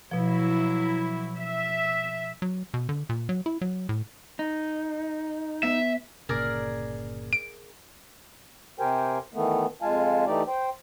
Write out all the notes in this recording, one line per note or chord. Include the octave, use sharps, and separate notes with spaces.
B2 F3 F#3 E4
E5
F#3
B2
D3
A#2
F#3
E4
F#3
A2
D#4
B3 E5
G1 A#2 C#3 G#4 A#4 D5
D7
C3 G4 A#4 C5 G5 G#5
D#3 E3 A3 B3
F2 G#3 F4 F5 G#5 A5
E3 A3 D#4 G4 D5
C5 G5